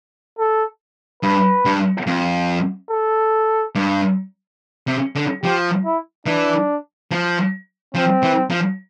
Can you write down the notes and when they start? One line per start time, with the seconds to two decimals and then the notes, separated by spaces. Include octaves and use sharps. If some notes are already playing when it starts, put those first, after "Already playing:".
0.39 A4
1.23 G2 B4
1.65 G2
2.07 F2
2.91 A4
3.75 G2
4.87 C3
5.16 D3
5.43 F3 G4
5.85 E4
6.26 E3 D4
7.11 F3
7.95 F3 C4
8.23 E3
8.50 F3